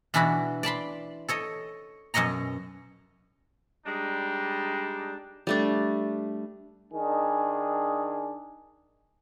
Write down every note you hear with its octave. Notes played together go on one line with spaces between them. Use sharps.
B2 E3 D4 E4 F#4 B5
D5 A5 B5 C6
A4 C#5 D#5
F#2 B2 C#5 D#5 A#5
G3 G#3 D4 D#4
G3 A3 D4
D#3 D4 G#4